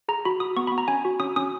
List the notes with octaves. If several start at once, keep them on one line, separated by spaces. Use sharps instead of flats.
G#4 A#5
F#4 B5
F#4 D#6
B3 C#6
B5
B3
A#5
C#4 G#5
F#4
C#4 D#6
C#4 D#6